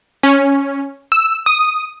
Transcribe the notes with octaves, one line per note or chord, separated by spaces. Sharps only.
C#4
E6
D#6